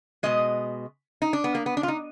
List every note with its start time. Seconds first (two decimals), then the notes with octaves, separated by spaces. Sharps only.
0.23 B2 G#3 D#5
1.22 D#4
1.33 D4
1.44 B3
1.55 A#3
1.66 B3
1.77 D4
1.83 F4
1.88 D#4